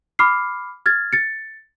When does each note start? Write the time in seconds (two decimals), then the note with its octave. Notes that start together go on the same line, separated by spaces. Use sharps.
0.19 B5 D6 F6 C7
0.86 F6 G#6 A6
1.13 A6 C#7